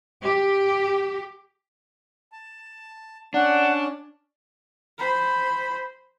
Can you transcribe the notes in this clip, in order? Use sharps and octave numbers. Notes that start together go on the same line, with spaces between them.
G4
A5
C#4 D4 D5 F#5
C5 B5